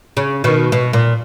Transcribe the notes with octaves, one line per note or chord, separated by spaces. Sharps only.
C#3
B2 D#3
B2
A#2